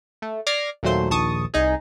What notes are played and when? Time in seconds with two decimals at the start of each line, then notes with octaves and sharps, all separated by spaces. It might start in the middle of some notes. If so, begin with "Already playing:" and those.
0.22 A3
0.47 D5 D6 F6 G#6 A#6 C7
0.83 D#2 A#2 F#3 A3 C5 C6
1.10 A#1 D#2 A5 C#6 D#6
1.54 C2 D#4 G#4